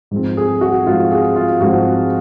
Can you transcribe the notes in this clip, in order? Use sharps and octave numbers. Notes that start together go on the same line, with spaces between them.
G#2 F3 C4
G#4
F#4
G#2 F3 C4 F4
G#4
F4
G#2 F3 C4 F#4